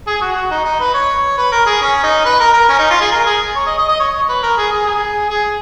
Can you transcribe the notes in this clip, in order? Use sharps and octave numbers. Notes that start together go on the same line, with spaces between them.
G#4
F#4
F#4
D#4
D#4
B4
C#5
B4
A#4
G#4
C#4
D#4
B4
A#4
A#4
C#4
D#4
F4
G#4
A#4
G#4
C#5
D#5
D#5
D#5
C#5
C#5
B4
A#4
G#4
G#4
G#4
G#4